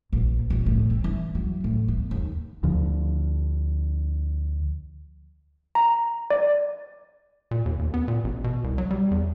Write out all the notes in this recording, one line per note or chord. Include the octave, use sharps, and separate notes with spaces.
A#1
D#1
A2
C4
E3
F#3
A2
B3
D#2
D2 D3 F3
A#5
D5
A#2
D#2
D#2
B3
A#2
A1
B2
C2
F#3
G3
E2